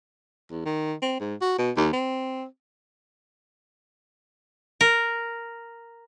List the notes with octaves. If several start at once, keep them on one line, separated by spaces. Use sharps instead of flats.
E2
D#3
C4
G#2
F#4
B2
D#2
C4
A#4